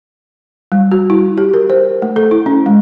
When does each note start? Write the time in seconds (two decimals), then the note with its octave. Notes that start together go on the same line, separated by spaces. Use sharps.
0.72 G3
0.92 F#4
1.10 E4
1.38 G4
1.54 A#4
1.70 C5
2.02 A3
2.16 A4
2.31 E4
2.46 C#4
2.66 G#3